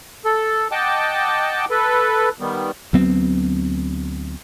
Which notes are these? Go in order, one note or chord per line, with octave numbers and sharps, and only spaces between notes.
A4
D#5 F#5 G5 A5 D6
A4 B4
D#3 G3 B3
D2 F#3 B3 C4